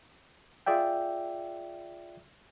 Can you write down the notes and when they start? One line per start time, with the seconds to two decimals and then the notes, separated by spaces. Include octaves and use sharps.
0.66 F4 G#4 D5 E5 G5